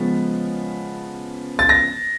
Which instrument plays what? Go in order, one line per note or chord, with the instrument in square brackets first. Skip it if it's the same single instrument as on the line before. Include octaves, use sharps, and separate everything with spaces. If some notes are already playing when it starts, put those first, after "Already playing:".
Already playing: [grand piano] C#3 F3 G#3 B3
A6
A#6